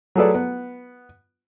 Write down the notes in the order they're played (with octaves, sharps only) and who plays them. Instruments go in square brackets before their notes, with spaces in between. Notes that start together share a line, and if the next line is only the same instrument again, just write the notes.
[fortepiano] F#3 A3 G#4 A4 B4 D5
B3